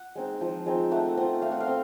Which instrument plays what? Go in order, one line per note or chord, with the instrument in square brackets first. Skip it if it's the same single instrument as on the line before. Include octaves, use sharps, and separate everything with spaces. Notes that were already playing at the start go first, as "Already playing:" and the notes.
Already playing: [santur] F#5
G#3 C4 D#4
F3
G#3 C4 D#4
A3 F#5
C4 F4 F#5
A3 F5
F#5
F5
C4